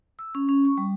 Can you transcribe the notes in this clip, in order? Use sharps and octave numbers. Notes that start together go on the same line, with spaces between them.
E6
C#4
C#4
C#6
G3